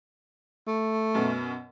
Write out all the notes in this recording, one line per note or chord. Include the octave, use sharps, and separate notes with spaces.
A3
F#2 B2